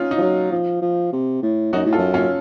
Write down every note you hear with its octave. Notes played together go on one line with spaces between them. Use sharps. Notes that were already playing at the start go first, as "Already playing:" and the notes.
Already playing: C#4 D#4 F4
D#4
F3
F#3
F3
F3
C3
A2
F#2 D#4 F#4
A2
F4 A4
F#2
C#4 F4